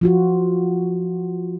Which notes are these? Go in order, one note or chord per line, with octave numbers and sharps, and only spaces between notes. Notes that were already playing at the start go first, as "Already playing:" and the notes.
F3 F4 F#4